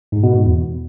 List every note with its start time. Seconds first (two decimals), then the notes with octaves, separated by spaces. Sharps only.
0.12 G#2
0.23 B2
0.34 G#2
0.45 E2